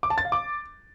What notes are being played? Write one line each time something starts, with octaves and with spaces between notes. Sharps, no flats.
D6
A5
A6
F5
D6